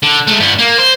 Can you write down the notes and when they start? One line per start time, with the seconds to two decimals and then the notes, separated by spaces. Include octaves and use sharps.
0.03 D3
0.27 G#3 A3
0.40 G2 B3
0.58 A#3
0.78 C5